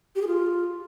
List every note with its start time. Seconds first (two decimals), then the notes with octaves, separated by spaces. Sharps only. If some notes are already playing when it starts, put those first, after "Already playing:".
0.16 G4
0.22 G#4
0.27 F4